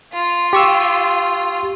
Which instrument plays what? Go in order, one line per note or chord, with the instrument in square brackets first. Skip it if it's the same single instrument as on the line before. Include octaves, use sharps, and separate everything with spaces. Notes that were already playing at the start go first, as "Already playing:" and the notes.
[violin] F4
[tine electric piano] G4 C#6 E6